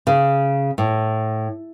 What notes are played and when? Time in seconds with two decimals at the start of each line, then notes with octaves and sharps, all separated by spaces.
0.07 C#3
0.78 A2